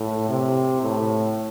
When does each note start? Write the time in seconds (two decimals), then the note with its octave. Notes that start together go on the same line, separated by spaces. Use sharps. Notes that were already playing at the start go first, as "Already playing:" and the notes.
Already playing: A2
0.29 C3
0.82 A2